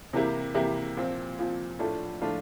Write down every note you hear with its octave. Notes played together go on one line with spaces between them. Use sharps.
C3 E3 A#3 E4 G4
C3 E3 A#3 E4 G4
A#2 F3 C4
A#2 F3 C4
A2 F3 A3 D4 F4
A2 F3 A3 D4 F4